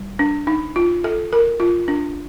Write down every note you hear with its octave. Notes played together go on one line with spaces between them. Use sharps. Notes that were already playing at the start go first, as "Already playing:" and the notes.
Already playing: G3
D4
D#4
F4
A4
A#4
F4
D4